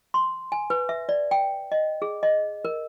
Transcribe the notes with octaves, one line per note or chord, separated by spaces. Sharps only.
C6
G#5
B4
E5
D5
G5
D#5
G#4
D#5
A#4